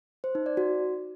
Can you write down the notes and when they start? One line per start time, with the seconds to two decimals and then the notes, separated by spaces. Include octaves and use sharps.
0.24 C5
0.35 D#4
0.46 D5
0.57 F#4